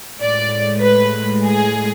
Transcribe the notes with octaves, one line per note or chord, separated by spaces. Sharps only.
A2 G#3 D5
B4
G#4